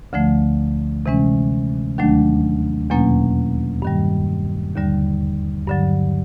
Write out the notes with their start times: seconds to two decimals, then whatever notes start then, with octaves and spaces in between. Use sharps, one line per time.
0.13 D2 D3 F3 A3
1.06 C3 E3 G#3 C#4
1.98 D#2 D#3 F#3 A3 D4
2.90 E2 B2 F#3 A#3 C#4
3.82 G2 D#3 G3
4.75 D#2 D3 G3
5.67 G2 D3 F#3